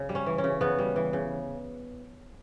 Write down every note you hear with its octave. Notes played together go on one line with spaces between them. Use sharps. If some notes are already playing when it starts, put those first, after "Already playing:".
Already playing: C#3
G3
C#4
E3
C#4
C#3
C#3 B3
G3
E3
C#3